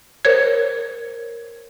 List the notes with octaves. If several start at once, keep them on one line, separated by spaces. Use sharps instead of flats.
A#4 C5 C#5 G#6